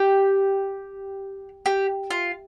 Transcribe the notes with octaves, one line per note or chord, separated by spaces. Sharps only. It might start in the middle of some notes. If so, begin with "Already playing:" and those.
Already playing: G4
G4
F4